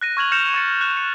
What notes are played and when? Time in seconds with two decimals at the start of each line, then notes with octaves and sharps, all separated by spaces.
0.01 F#6 A#6 D#7
0.17 C#6 F6 G#6 D#7 F7 F#7
0.31 F6 G6 A#6 C#7 E7 F7
0.54 C#6 A6 C#7
0.81 F#6 E7
0.97 C#7